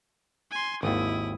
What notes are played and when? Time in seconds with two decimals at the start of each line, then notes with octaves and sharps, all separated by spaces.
0.52 G#5 C6
0.83 G#1 D#2 E4 D#6